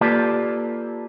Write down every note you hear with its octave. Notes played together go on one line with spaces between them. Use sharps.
A#3 F4 G4 A4 B4 D5